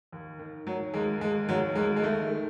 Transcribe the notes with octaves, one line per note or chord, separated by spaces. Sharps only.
D#2
D#3
D#3 F#3
D#2 G#3
D#2 G#3
D#2 F#3
D#2 G#3
G#3
D#3 A3
D#3